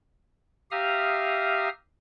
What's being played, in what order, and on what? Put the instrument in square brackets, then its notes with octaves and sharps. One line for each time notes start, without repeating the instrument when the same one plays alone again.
[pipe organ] G4 E5 F5 A#5 D#6 F6